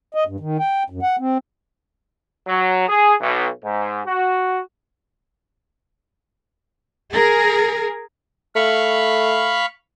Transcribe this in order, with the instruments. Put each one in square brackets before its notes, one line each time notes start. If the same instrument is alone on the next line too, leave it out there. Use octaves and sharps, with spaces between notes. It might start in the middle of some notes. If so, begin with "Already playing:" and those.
[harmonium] D#5
G2
D#3
G5
F#2
F#5
C4
[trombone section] F#3
G#4
B1
G#2
F#4
[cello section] G#4 A#4
[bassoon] A3 [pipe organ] F5 B5 C#6